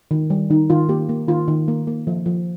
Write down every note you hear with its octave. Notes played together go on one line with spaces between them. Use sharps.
D#3
G3
D#3 D#4
D#3 F4
A#3 G4
A#3
D#3 F4
D#3
A#3
A#3
F3
F3